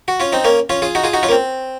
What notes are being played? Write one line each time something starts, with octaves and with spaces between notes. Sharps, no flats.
F#4
C#4 F4
C4 D#4
A#3 C#4
C#4 F4
F4 G#4
D#4 F#4
F4 G#4
D#4 F#4
C#4 F4
A#3
C4